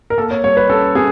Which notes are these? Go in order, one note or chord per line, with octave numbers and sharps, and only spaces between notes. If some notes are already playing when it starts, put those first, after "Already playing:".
A#4
A#3 A4
C#5
G3 C#5
B4
C#4 A4
C#4 G#4